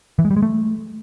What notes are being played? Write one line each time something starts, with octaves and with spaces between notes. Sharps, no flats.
E3
G#3
G3
G#3
A3